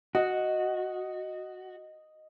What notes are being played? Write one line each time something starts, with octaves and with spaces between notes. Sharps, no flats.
F#4 D#5